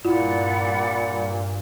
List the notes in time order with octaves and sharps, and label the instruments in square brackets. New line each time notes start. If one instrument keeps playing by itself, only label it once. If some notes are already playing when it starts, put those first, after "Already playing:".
[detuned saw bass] G2 [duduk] A#2 [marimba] E4 F4 [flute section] D5 F#5 B5